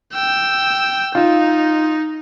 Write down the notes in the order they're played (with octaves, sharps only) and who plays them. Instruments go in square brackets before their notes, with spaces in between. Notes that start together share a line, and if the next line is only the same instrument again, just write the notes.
[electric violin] G5 E6
[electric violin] D#4 [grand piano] F4